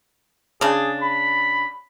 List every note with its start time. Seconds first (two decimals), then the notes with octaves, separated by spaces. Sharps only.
0.61 C#3 D4 G#4
1.00 B5